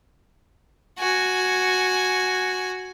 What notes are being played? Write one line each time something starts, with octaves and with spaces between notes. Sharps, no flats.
F#4 G#5